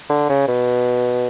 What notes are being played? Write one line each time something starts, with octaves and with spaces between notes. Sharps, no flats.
D3
C#3
B2